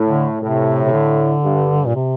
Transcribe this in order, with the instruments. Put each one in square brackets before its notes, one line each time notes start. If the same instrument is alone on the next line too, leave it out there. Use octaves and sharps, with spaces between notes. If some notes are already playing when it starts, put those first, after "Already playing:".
Already playing: [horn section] A2
[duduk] D3
[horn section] A2 [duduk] C3
[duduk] C3
D3
[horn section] G2
[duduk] A#2
C3